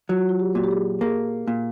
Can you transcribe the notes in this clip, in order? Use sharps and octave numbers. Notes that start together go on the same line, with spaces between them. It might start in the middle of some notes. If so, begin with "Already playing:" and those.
F#3 F4
F#4
F4
G4
A#2 F#4
G4
G#4
A#3 G#4
A#2